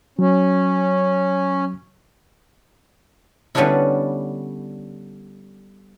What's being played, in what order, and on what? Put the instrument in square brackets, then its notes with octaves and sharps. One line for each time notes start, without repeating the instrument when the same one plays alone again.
[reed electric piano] F#3 [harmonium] C#4
[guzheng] D3 G3 B3 C#4 D4 E4